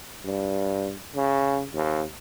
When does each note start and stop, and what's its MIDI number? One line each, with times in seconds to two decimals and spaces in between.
0.24 0.93 43
1.16 1.64 49
1.74 2.04 39